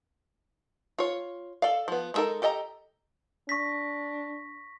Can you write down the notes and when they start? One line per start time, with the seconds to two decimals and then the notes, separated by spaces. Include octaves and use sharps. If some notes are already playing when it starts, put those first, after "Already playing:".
0.98 F4 C#5
1.62 A4 D5 F5
1.88 F3 B3
2.14 G#3 B3 D#4 A4 A#4
2.42 G4 A4 D#5 A5 A#5
3.49 D4 C#6 A#6 B6